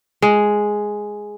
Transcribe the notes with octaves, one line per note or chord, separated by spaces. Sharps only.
G#3